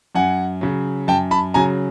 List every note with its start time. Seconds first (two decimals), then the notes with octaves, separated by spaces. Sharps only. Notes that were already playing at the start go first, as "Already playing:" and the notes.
0.15 F#2 F#5 G#5
0.61 C#3 F#3
1.08 F#2 G5 A5
1.31 A5 B5
1.54 C#3 F#3 G#5 A#5